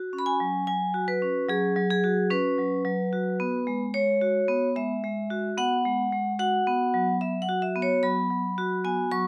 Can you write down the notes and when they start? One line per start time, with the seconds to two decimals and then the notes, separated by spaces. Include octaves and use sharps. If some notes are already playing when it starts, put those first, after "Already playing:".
Already playing: F#4
0.13 C#4
0.19 B5
0.26 G#5
0.40 F#3
0.67 F#3 G#5
0.94 F#4
1.08 B4
1.22 C#4
1.49 F#3 G#4
1.76 F#3
1.90 G#4
2.04 F#4
2.30 C#4 B4
2.58 F#3
2.85 F#3
3.13 F#4
3.40 B3
3.67 G#3
3.94 G#3 C#5
4.21 F#4
4.48 B3
4.76 G#3 E5
5.04 G#3
5.30 F#4
5.58 B3 F#5
5.85 G#3
6.12 G#3
6.39 F#4 F#5
6.67 B3
6.94 F#3
7.21 F#3 E5
7.42 F#5
7.49 F#4
7.62 E5
7.76 B3
7.82 C#5
8.03 F#3 B5
8.30 F#3
8.58 F#4
8.84 B3 G#5
9.12 F#3 C#6